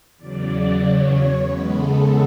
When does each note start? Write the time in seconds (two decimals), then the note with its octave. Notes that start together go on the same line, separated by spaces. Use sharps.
0.17 E2 C#3 F#3 D5
0.79 C#5
1.39 E2 C#3 G#3 B3 B4
1.70 A4